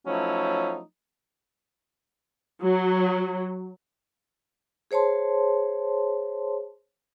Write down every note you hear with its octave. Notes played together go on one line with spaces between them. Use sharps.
F3 F#3 A3 C#4 D#4 E4
F#3
G#4 C5 C#5 A5 C6